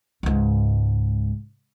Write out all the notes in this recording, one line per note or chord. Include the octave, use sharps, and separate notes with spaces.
C#2 G#2